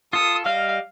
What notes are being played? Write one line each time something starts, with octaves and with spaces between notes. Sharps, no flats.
F4 A4 D#6
G3 D#5 F5 F6